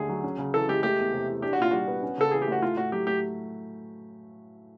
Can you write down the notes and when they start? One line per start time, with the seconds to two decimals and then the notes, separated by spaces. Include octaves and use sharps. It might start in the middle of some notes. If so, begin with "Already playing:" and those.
Already playing: D#2 D3 A3 G#4
0.09 F#3
0.24 C#4
0.38 C#3
0.53 E3 A4
0.69 G#3 G4
0.83 A3 G4
0.98 E2
1.13 C3
1.28 E3
1.42 D4 G4
1.53 F#4
1.58 A#2 F4
1.71 G3 F#4
1.88 B3
2.03 C#4
2.18 C#3 A4
2.31 E3 G#4
2.42 G4
2.47 A3 F#4
2.62 A2 F4
2.77 A2 F#4
2.92 F#3 G4
3.06 A3 G4